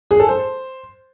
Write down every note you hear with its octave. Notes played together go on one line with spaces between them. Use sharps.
G#4
A4
C5